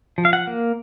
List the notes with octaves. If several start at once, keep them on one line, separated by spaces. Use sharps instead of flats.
F3
F5
F#5
A#3